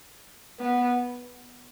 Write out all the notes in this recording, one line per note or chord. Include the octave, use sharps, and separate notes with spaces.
B3